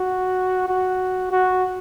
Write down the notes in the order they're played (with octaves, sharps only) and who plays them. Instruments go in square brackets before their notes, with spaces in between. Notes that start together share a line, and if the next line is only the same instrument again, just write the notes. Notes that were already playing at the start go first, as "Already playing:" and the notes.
Already playing: [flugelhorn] F#4
F#4
F#4